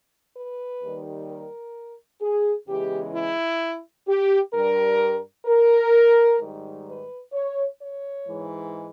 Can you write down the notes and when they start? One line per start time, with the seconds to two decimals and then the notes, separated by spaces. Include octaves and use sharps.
0.34 B4
0.81 D#2 D#3 G3
1.28 A#4
2.20 G#4
2.67 E2 C#3 E3 G#3 G4
3.13 E4
4.07 G4
4.53 G2 G3 A#4
5.46 A#4
6.39 G#2 D#3 G3
6.87 B4
7.32 C#5
7.79 C#5
8.25 G#2 E3 G#3